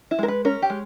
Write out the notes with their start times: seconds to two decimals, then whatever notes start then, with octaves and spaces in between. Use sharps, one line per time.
0.11 E4
0.19 G#3 A#4
0.28 B4
0.45 C#4 A#4
0.62 G4
0.70 G#3